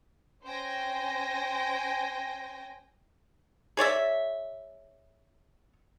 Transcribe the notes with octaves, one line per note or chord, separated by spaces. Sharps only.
C#4 C5 G5 G#5 A#6
G#4 C#5 D5 E5